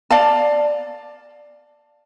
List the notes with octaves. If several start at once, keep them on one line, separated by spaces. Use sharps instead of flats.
D5 F5 A5